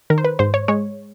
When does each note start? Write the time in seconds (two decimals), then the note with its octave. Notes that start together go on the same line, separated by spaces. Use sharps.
0.10 D#3 A#4
0.18 C5
0.24 B4
0.39 G#2 C5
0.54 C#5
0.68 G#3 C#5